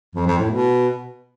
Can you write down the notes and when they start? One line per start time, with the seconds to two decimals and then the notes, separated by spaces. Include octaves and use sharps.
0.15 F2
0.27 F2
0.38 A2
0.50 B2